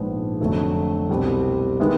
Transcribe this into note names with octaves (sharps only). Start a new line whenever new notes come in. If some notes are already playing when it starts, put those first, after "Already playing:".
Already playing: A#1 G#2 F3 G#3 B3
F1 F2 D3 F#3 A3
C2 B2 G3 C4
D#3 G#3 B3 E4